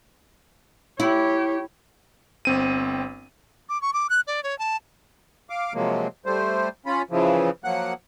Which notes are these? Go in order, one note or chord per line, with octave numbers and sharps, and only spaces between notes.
E4 G4 C#5
G1 C4 D#7
D6
C#6
D6
F#6
D5
C#5
A5
F5 D6
C3 F3 F#3 G#3 A#3
G3 A3 C5
C#4 F4 B5
C#3 E3 F3
F3 F#3 A#3 F#5 F#6